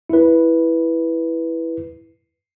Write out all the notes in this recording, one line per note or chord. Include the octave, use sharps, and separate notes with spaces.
E4 B4